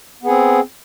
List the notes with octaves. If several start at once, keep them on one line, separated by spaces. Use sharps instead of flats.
B3 C4 G#4